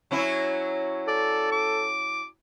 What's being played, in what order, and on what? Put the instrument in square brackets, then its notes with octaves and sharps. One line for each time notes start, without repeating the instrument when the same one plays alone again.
[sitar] F#3 C#4 E4
[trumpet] A4 [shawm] D5
[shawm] D6